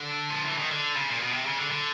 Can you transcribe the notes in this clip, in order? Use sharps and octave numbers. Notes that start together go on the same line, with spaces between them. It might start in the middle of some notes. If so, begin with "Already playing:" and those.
Already playing: D3
F3
E3
D#3
D3
C#3
A#2
B2
C3
C#3
D3
D3